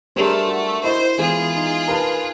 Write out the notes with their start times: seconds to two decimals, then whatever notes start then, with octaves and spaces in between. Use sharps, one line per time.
0.16 G3 A3 D4 G#4 A#4 C5
0.48 F#4
0.84 E4 C5 D#5
1.18 E3 G#3 B3 F4 G#4
1.57 D#4
1.88 A#4 B4 A5